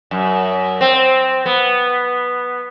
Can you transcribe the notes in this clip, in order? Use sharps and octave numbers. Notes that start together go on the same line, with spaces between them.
F#2
C4
B3